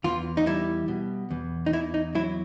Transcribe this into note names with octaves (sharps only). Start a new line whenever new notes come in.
E2 F4
D#4
G3 E4
B2
E2
D#4
E2 E4
D#4
F#3 E4